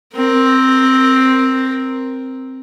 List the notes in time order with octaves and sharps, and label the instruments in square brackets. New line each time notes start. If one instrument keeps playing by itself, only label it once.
[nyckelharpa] C4 A#4